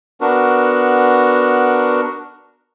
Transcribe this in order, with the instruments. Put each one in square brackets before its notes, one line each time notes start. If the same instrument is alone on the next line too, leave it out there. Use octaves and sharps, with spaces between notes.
[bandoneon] B3 D4 F#4 A#4